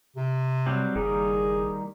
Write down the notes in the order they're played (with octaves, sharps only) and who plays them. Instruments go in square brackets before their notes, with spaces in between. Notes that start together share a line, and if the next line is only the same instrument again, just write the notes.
[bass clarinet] C3
[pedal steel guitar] F#3 G3 C4
[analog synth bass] F#1 [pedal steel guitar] D#3 G3 A#3 [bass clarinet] G#4